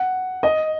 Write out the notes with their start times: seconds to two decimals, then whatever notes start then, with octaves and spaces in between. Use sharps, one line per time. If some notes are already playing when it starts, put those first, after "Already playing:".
Already playing: F#5
0.43 D#5